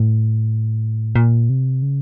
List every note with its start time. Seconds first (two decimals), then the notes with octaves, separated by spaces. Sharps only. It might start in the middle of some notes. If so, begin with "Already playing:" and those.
Already playing: A2
1.16 A#2
1.50 C3
1.82 C#3